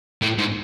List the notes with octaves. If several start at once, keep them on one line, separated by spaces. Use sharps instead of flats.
A2
G#2